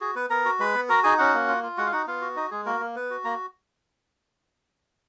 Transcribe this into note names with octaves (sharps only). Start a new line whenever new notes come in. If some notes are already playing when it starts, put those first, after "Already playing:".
F#4 G#4
B3 B4
B3 A#4 A#5
F#4
G#3 B4 B5
B3
F#4 A#4 A#5
D#4 G#4 G#5
C#4 F#4 F#5
A#3
F4
F4
G#3 F#4 F#5
F5
D#4 F#4 F#5
B3 F4 F5
F#4
D#4 D#5
G#3 G#4
A#3 F#4 A#4
A#3
B3 B4
F#4
A#3 A#5